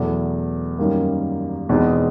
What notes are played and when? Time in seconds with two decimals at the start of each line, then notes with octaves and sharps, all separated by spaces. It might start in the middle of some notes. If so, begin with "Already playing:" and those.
Already playing: E2 B2 F#3 A3
0.78 F#2 D#3 G3 A#3
1.69 E2 B2 G#3 C4 D#4